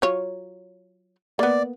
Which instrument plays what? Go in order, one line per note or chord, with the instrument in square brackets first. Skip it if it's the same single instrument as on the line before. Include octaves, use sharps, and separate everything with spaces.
[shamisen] F#3 F4 C#5
[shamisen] A#3 B3 [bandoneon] D5